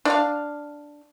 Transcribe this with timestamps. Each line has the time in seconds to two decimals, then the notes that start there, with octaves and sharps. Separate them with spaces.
0.05 D4 F5